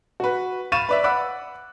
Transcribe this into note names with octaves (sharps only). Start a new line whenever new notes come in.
F#4 B4
F5 B5 C#6 A6 D#7 E7
B4 D5 E5
F#5 B5 D6 E6 F#6